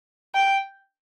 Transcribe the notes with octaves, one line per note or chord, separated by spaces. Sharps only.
G5